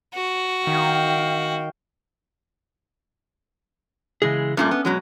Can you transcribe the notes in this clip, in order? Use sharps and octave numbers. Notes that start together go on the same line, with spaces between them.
F#4
D#3 F5 G5
C#3 E3 G#3 G#4
G2 A#2 A3 C#4
B3
B2 F#3 G#3